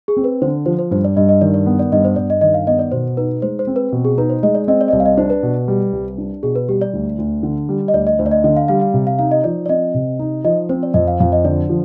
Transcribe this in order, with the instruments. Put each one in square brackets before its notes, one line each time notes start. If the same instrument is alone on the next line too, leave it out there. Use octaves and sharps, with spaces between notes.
[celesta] G#4
[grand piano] C4
[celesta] B4
[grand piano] D3 [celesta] C5
[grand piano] F3 [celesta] C5
[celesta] C5
[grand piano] G2 [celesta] C5
[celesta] D5
[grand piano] G2 [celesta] D#5
[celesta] D#5
[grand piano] D#3 [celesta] D5
[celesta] D5
[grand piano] B3
[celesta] D5
[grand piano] G2 [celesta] D#5
[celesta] C5
[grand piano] G2 [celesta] D5
[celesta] D#5
[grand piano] D#3 [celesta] D#5
[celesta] F5
[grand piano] B3 [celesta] D#5
[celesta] D5
[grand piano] B2 [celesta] C5
[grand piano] D#4 [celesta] B4
[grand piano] G#3 [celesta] C5
[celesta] C5
[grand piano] C4
[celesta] B4
[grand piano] B2
[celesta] G#4
[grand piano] D#4 [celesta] B4
[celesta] C5
[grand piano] G#3 [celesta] D#5
[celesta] D5
[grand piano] C4 [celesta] D#5
[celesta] D5
D#5
[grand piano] C2 [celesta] D5
[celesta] F5
D#5
[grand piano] D4 [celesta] C5
[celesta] B4
[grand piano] B2
G3
C2
D4
[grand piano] B2 [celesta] G#4
[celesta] B4
[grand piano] G3 [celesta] G4
[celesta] D5
[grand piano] D2
D2
D3
G3
[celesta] D#5
[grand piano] D2 [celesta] D5
[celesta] D#5
[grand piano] D2 [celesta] C5
[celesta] D5
D#5
[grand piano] D3 [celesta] D#5
[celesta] F5
[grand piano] G3 [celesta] F5
[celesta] F5
[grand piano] C3
[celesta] F5
[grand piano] D#4 [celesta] F5
[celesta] D#5
[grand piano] F3 [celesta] D5
[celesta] D5
[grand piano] C4 [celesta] D#5
[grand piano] C3
D#4
[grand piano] F3 [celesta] D#5
[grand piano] C4 [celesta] C5
[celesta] D5
[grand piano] F2 [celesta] D#5
[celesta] F5
[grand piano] F2 [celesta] F5
[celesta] D#5
[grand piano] D3 [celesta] D5
[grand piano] F3